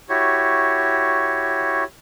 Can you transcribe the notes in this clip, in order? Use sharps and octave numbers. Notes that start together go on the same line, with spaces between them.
E4 F#4 G4 C#5